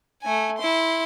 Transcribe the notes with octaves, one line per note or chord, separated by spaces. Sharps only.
A3 G#5
E4 C6